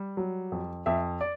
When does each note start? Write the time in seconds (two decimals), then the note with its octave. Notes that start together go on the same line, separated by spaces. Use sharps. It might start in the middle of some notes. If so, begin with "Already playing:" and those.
Already playing: G3
0.17 F#3
0.52 F2
0.86 F2 E5
1.21 D5